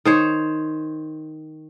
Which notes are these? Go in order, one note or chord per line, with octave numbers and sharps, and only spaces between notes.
D#3 C5 C#5